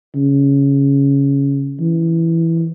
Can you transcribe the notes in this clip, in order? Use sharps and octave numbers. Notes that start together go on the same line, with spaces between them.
C#3
E3